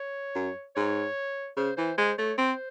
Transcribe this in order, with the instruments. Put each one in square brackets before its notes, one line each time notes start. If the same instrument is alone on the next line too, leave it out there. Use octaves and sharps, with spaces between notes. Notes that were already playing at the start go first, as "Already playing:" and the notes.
Already playing: [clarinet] C#5
[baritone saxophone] F#2
[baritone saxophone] G#2 [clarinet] C#5
[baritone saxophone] C#3 [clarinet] C5
[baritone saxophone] E3 [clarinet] C5
[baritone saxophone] G#3 [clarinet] C5
[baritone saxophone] A3 [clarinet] C#5
[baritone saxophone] C4 [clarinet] C5